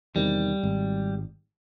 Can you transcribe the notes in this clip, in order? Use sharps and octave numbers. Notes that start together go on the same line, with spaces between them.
E2 C3 D#3 G3
G#1